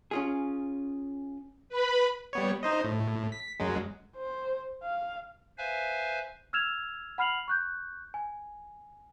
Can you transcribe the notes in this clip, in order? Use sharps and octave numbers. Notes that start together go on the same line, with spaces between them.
C#4 F4 G#4
B4 B5
G3 B3 C#5
D#4 C5 D#5
A2
B6
F#2 F#3 G#3
C5
F5
B4 C5 E5 F5 G#5
E6 F6 G#6 E7 F7
F#5 B5 F6 C7 F7 F#7
C#6 F#6 G6
G#5